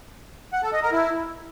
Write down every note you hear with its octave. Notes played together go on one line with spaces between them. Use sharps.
F#5
A4
D#5
A#4
E4